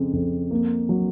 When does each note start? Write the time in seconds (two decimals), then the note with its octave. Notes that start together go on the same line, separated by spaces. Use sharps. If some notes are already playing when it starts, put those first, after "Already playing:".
Already playing: F2 C#3
0.13 F2
0.51 A#3
0.89 F#3